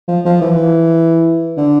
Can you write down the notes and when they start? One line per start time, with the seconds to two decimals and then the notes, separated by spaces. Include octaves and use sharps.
0.08 F3
0.25 F3
0.41 E3
1.57 D3